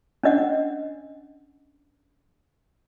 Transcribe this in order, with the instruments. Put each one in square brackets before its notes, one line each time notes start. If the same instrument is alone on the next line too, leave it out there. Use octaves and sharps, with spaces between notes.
[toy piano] C#4 D4 D#5 F#5